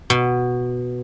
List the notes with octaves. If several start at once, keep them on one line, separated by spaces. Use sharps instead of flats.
B2